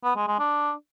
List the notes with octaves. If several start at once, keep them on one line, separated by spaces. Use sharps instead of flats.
B3
G#3
G#3
D4